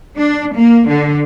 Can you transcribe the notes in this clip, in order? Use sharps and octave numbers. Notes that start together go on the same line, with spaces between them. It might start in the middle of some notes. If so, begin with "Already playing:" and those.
D4
A#3
D3